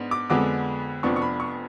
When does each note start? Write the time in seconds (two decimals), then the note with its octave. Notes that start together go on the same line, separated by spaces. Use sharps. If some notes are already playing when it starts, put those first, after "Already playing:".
Already playing: G#2 B3 D4
0.11 D6
0.30 F2 D3 G#3 B3 D4 D6
1.03 F1 F2 F3 B3 D4 C#6
1.16 C#6
1.22 B5
1.40 C#6